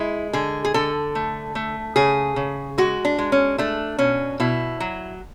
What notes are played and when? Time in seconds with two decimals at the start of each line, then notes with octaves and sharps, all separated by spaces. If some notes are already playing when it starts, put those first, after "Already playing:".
Already playing: G#3 E4
0.33 D3 G#4
0.65 G#4
0.74 D3 A4
1.15 A3
1.55 A3
1.96 C#3 G#4
2.36 C#3
2.78 G#3 F#4
3.05 D4
3.19 G#3
3.32 C#4
3.58 A3 D4
3.99 B2 C#4
4.40 B2 E4
4.80 F#3